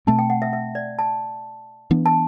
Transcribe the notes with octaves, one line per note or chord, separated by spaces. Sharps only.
B2 A3 C4 A5
G5
F#5
E5
E5
D5
A5
E3 B3 D4
A5